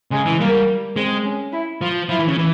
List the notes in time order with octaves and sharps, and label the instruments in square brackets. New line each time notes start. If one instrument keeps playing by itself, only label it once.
[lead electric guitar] C#3 [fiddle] G#3
[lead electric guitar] E3
[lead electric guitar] G3 [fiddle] A#3
[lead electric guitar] G#3 [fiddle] C4
[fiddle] C#4
E4
[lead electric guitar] F3 [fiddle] F4
[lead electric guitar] F3 [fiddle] E4
[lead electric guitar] E3
C#3
E3